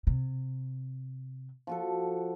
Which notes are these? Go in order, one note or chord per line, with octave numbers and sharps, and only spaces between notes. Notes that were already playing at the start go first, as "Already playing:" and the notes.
C3
F3 F#4 A4